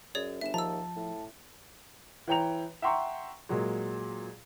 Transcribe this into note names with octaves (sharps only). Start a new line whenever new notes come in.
F#2 G#4 C#5 D5
G1 E5 E7
D#2 F3 A5 A#5 E6
A2
E3 C#5 G5 A#5 F7
E5 F#5 G5 A#5 C6 C#6
A#2 F#3 G#3